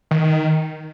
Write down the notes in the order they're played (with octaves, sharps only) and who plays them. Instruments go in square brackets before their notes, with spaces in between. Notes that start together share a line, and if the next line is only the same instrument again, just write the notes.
[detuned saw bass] D#3